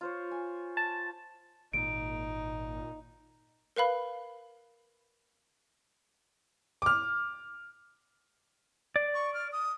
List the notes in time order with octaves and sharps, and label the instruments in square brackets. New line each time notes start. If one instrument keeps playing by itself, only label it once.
[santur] F4 C5 C#5
G#5
[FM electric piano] A5
[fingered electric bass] G#1 [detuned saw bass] A#2 [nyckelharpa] D#4 [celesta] D7
[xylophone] A#4 B4 F5 B5
[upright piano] D6 F6
[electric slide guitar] D5
[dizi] C#6
F6
D#6